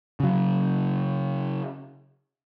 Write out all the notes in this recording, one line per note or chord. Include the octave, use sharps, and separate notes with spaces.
C#3 F#3